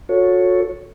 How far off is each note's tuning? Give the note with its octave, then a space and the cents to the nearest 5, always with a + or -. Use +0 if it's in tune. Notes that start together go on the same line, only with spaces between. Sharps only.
F#4 -35 A4 +0 C#5 +0